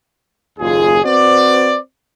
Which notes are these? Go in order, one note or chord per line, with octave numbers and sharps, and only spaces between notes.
F#1 D#2 F4 G#4
C4 F#4 B4 C5 D5